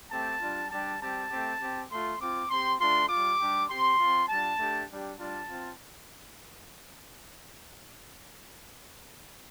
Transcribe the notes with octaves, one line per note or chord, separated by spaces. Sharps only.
A3 C4 G4 A5
G3 D4 F4
G3 D4 G4 A5
G3 C4 G4 A5
A3 C4 G4
C4 G4
A3 F4 C6
C4 F4 D6
C4 G4 C6
A3 D4 F4 C6
G3 F4 D6
G3 D4 G4
C4 G4 C6
C4 F4
G3 D4 F4 A5
A3 D4 G4
G3 D4 G4
G3 D4 F4 A5
C4 F4